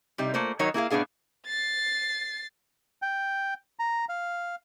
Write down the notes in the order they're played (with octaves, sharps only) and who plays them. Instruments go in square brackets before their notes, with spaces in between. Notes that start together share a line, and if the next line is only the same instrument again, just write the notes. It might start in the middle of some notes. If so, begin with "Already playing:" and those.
[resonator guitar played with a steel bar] C3 G3 D#4
A3 A#3 F4 C5
D#3 F#3 D#4 A#4 C#5
A#3 E4 G#4 F5
A2 B3 D4 G#4 F5
[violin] A6 C7
[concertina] G5
A#5
F5